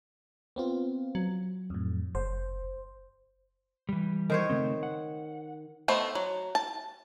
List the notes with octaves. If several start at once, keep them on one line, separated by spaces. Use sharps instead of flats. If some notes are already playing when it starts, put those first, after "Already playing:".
B3 C4 F4
F#3
F2 A2
F#1 C5
E3 G3
D#3 C5 C#5
C#3 A3 C4
F#5
A3 B3 C5 D#5
F#3
A5